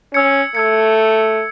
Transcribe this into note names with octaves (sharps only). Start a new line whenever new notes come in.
C#4 E6 G#6 C#7
A3 E6 G#6 C#7